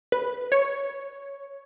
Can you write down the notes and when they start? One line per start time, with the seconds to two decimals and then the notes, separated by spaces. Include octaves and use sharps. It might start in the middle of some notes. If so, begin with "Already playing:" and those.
0.12 B4
0.52 C#5